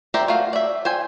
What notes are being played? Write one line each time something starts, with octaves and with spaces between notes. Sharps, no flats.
G4 A#4 C5 D5 E5
A3 F#4 F5
D5 E5
C5 G5 G#5